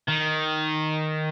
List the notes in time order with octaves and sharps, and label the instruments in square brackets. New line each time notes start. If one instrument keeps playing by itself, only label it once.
[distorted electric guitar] D#3